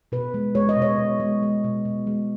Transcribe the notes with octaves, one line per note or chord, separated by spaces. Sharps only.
B2 B4
G#3
G#3 C#5
D#5
B2 C#5
B2
G#3
G#3
B2
B2
G#3